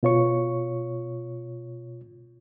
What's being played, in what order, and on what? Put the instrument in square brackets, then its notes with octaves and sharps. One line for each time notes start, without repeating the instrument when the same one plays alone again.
[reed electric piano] B2 F4 C#5 C#6